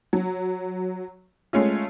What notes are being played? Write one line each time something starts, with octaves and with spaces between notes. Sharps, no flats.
F#3
G#3 A3 C#4 F4